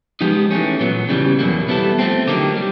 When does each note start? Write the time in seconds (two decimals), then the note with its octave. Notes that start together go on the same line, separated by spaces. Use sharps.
0.21 F3 G#3 B3 D#4 G4
0.51 E3 A3 C#4
0.80 A#2 F#3 B3
1.09 C#3 E3 G3
1.39 E2 B2 F#3 A#3
1.68 G3 B3 E4 A4
1.99 F3 A3 C4
2.27 D3 F#3 A#3 D#4 G4
2.57 G3